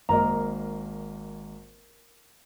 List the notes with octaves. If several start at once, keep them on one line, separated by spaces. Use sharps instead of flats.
G#1 A#3 A#4 D#5 A#5